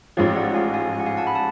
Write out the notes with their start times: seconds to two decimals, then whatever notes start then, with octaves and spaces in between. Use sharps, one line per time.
0.17 A1 G#2 F3 C#5 F5
0.36 D5 F#5
0.54 F5 G#5
0.74 F5 G#5
0.93 G#5
1.00 F#5
1.06 F5 G#5
1.17 F#5 A5
1.27 B5
1.35 A5